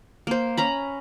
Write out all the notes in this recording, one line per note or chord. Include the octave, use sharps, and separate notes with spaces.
A#3 C5
C#4 A#5 B5